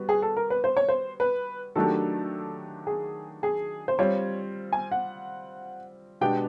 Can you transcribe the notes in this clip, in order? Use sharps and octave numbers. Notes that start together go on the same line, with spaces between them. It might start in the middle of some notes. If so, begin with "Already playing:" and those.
Already playing: G3 B3 F#4
G#4
A4
A#4
B4
C5
C#5
C5
B4
D#3 F#3 A3 D4 G4 A4
G#4
G#4
C5
G3 C4 F4 C#5
G#5
F#5
B2 G#3 B3 D4 G4 G5